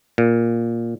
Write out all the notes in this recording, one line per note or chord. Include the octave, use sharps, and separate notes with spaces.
A#2